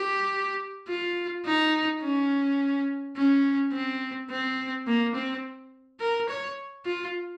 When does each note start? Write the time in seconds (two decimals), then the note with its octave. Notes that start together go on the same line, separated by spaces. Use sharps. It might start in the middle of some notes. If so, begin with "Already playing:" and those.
Already playing: G4
0.88 F4
1.46 D#4
2.02 C#4
3.17 C#4
3.73 C4
4.30 C4
4.87 A#3
5.15 C4
6.01 A#4
6.29 C#5
6.86 F4